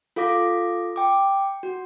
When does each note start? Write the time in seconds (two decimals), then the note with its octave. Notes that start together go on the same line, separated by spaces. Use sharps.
0.16 F4 A4 F5 D6 A#6
0.96 G5 D6
1.63 F#4